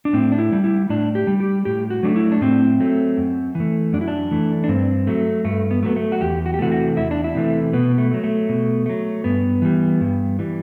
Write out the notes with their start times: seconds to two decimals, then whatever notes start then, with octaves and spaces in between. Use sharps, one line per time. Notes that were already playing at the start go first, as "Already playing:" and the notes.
0.05 D4
0.13 A2 C4
0.32 D4
0.39 E4
0.52 G3
0.64 E4
0.89 A2 D4
1.15 G4
1.27 G3
1.40 G4
1.65 A2 G4
1.90 F#4
2.03 F#3 A3 D4
2.16 E4
2.32 D4
2.41 A2 C4
2.80 F#3 A3
3.17 F#2
3.55 E3
3.60 A3
3.93 F#2 D4
4.01 E4
4.08 D4
4.31 E3 A3
4.64 D4
4.68 G2 C4
5.07 F#3 A3
5.44 G2 A3
5.71 B3
5.83 F#3 A3 B3
5.96 A3
6.12 F#4
6.21 E2 G4
6.46 F#4
6.54 G4
6.59 C3 E3 A3 F#4
6.72 F#4
6.96 E2 E4
7.11 D4
7.24 E4
7.35 C3 E3 A3
7.73 B2 B3
7.98 A3
8.11 F#3 A3
8.24 A3
8.49 B2
8.86 F#3 A3
9.24 G2 B3
9.62 E3 G3
10.01 G2
10.39 E3 G3